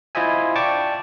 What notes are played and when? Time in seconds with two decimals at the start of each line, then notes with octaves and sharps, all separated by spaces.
0.15 E4 F4 C5 D#5 E5 G#5
0.56 D5 G5 A5 C#6 D6